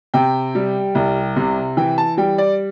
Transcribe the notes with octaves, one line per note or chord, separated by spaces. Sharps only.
C3 G5
G3
C2
C3
E3 G5
A5
G3 G5
D5